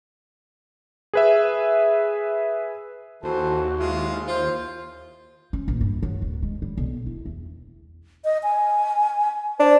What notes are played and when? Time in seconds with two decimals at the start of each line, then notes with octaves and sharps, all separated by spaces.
1.14 G#4 B4 E5
3.23 D#2 E3 F#4 A4 C5
3.78 G#3 E4 F4
4.27 F4 C5
5.53 C#4
5.68 A#1
5.81 G2
6.03 F#3
6.22 D1
6.43 G#3
6.62 G3
6.78 B1
7.06 E4
7.26 E2
8.25 D#5
8.43 G#5
9.60 D4 C5